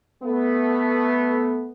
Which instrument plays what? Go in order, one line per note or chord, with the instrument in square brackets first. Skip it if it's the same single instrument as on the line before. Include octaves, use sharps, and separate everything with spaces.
[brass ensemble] A3 B3